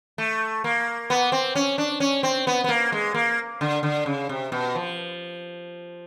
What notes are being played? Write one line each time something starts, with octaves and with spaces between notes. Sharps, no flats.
A3
A#3
B3
C4
C#4
D4
C#4
C4
B3
B3
A#3
G#3
A#3
D3
D3
C#3
C3
B2
F3